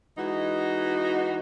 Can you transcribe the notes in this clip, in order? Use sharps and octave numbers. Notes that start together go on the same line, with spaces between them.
E3 G#3 D#4 F#4